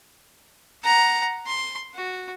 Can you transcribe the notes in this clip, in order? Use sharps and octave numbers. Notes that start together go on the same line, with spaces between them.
F#5 A#5
C6
F#4